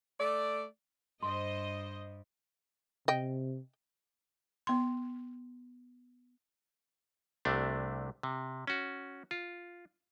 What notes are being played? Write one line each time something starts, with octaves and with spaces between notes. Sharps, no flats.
A3 D5
G2 C5 D#5 C6
C3 D#5 G5
B3 C6
C2 C3 A3 D4
C3
C#4 F#4
F4